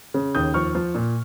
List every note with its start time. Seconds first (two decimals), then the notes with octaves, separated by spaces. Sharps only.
0.14 C#3
0.35 D#2 D#6 G6
0.54 F3 C#6 F6
0.75 F3
0.95 A#2